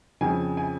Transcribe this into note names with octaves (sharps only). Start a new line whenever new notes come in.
F2 C#3 F3 G#5
G#5